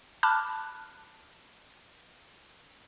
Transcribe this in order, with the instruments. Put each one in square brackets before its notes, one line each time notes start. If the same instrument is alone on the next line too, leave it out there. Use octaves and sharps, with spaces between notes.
[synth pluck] A5 B5 D6 F6 F#6